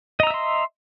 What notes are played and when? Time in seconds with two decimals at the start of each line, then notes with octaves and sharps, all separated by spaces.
0.20 D#5
0.23 A#5
0.27 E6
0.30 E5
0.34 C6